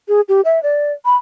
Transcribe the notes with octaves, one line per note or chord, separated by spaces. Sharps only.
G#4
G4
E5
D5
B5